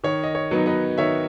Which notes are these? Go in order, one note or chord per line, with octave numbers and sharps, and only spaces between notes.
D#3 C#5
D#5
C#5
F#3 B3 D#4
B4 D#5
D#3 C#5 E5